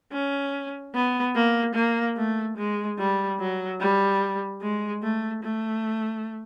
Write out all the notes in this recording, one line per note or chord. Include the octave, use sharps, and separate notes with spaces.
C#4
B3
A#3
A#3
A3
G#3
G3
F#3
G3
G#3
A3
A3